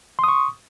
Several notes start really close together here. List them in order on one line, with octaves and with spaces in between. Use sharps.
C6 D#6 C#6